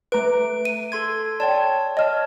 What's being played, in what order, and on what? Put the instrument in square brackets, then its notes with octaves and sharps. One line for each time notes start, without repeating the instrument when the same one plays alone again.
[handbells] A3 D7 [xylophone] B4 A#5
[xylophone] D#7
[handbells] A4 C6 G#6
[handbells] C#5 A5 [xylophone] D5 G5
[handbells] C#5 A5 [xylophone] D#5 F6